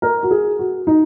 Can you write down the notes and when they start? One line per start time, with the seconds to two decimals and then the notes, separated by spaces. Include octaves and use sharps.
0.02 A#4
0.23 F#4
0.31 G#4
0.59 F#4
0.87 D#4